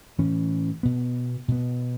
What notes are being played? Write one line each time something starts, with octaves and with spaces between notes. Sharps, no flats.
A2 E3 C#4
B2 B3
B2 B3